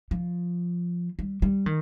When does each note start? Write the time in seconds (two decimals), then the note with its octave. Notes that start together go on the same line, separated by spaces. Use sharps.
0.11 F3
1.19 G3
1.42 G3
1.66 D#3